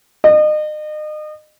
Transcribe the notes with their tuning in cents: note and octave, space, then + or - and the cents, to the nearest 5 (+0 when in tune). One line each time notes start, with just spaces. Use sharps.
D#5 -35